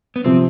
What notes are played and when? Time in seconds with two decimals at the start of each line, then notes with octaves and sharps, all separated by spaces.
0.16 B3
0.24 C3 F3 C4